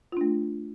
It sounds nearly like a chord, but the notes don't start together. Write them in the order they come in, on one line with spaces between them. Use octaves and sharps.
F4 D4 A3